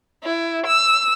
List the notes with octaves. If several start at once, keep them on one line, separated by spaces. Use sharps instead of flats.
E4
E6